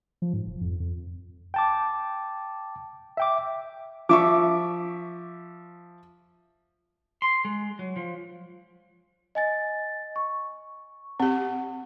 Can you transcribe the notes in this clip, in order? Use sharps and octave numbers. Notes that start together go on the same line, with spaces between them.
F3
G#2
F1
F2
F2
G5 A5 D6
E5 G5 D6
F3 E5 C#6 D6
C6
G#3
F#3
F3
D#5 G#5 A6
C#6
C4 G4 F#5